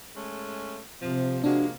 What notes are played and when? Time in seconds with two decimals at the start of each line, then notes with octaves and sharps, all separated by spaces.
0.15 G#3 A3 C#4
1.02 C3 F3
1.44 F3 G#3 A#3 D4 F#4